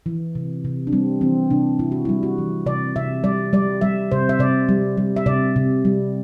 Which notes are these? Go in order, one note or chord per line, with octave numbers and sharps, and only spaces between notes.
E3
C3
C3
D4
G3 C4
E3 C4
C3 D4
C3 E4
F#4
G3 E4
F#4
E3
C3 D5
C3 E5
G3 D5
G3 D5
G3 E5
C3 C5
E5
C3 D5
G3
G3
E5
C3 D5
C3
G3